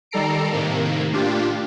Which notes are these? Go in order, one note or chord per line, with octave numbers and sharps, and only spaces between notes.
D#3 G3 A4 A#5 C7 D7
A2 C3 D#3 A#3
A2 D4 F4 G4